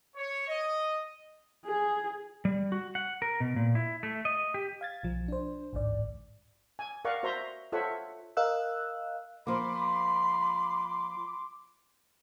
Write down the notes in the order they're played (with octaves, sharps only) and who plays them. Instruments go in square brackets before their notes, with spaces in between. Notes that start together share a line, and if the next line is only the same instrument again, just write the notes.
[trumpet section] C#5
D#5
[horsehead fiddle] G#4
[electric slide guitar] G3
F#4
F#5
A#4
B2
A#2
E4
A3
D#5
G4
[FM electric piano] F5 G#6 A6
B1 F3
D4 C5
A1 D2 G#2 D5
[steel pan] G#5
A#4 D5 F5 F#5 C#6 D6
F#4 C5 E5 A#5 C6
F4 A4 C5 C#5 E5 F#5
[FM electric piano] A#4 D#5 F5 E6 F#6
[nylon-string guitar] F3 A#3 [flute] B5 [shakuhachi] C6 [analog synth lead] D6